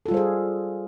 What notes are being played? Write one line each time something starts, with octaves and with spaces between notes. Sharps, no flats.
G3 F4 G#4 A4 C5